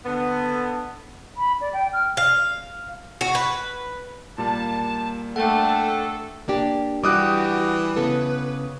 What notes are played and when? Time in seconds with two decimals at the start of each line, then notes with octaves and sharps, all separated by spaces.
0.05 D3 B3
1.37 B5
1.61 D5
1.73 G5
1.93 F6
2.17 F5
3.21 F#4
3.35 B4
4.38 A#2 G3 A#3 A5
5.36 A3 D4 A4 F#5 G5
6.48 A#3 D4 G4
7.04 E3 G3 F#4 G4 D6 D#6 F#6
7.97 C#3 B3 A4 B4